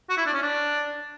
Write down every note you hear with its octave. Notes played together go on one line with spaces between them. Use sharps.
F#4
E4
D4
C#4
D4